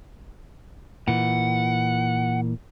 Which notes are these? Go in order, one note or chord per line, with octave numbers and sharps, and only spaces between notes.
A#2 E3 F#5